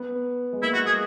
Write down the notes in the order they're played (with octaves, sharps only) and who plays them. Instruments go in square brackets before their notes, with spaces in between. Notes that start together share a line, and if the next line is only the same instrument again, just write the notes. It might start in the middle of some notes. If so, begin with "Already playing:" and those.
Already playing: [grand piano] B3
G#3
[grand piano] A#3 [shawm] E4
[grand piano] G#3 [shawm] F#4
[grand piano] G#3 [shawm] G#4